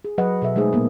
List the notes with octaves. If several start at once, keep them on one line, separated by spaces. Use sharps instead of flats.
G#4
F#3 G#4 B4 D#5 F#5
B2 A4 E5
G#3 A3 D#4 G#4 C5
A#2 A#3 B3